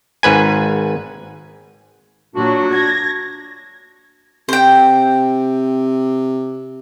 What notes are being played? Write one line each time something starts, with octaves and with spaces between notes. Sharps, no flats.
G#1 G#2 B4 G#5
A#2 F#3 D4 F4 F#4
G#6 A#6
C3 C5 G5